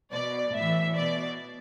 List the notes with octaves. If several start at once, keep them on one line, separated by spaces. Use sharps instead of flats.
B2 D5
A2 E3 E5
B2 D5